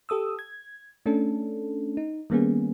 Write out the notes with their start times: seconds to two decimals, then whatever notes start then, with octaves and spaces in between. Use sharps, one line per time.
0.09 G4 A4 D#6 E6
0.39 G#6
1.06 A3 C#4 D4 A4
1.97 D#4
2.30 D#3 G3 A#3 B3 C#4 G#4